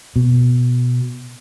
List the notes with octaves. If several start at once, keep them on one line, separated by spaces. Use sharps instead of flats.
B2